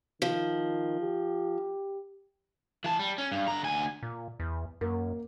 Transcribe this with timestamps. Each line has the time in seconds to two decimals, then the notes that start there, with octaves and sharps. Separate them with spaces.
0.22 D#3 F3
1.01 G4
2.84 E3 A5
2.99 G3
3.18 C#4
3.31 G2
3.48 D3 A#5
3.63 D2 G#5
4.03 A#2
4.40 E2
4.81 F#2 A#3